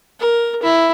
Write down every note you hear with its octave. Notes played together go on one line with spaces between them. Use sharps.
A#4
E4